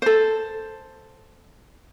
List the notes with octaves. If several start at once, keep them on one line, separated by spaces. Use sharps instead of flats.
A4 C5